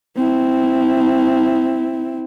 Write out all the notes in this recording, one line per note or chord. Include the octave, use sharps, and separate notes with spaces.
C4 E4